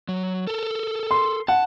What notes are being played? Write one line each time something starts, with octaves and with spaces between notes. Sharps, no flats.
F#3
A4 A#4
C6
F#5 A5